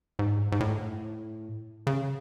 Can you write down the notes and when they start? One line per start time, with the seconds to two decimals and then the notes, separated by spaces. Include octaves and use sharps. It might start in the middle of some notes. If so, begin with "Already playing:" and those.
0.19 G#2
0.52 G#2
0.60 A2
1.87 C#3